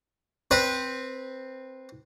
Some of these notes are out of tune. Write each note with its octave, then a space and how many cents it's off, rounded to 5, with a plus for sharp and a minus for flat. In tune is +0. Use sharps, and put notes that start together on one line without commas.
C4 +0 B4 -15